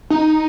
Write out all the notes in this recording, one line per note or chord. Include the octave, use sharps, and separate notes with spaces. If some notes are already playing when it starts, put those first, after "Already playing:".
D#4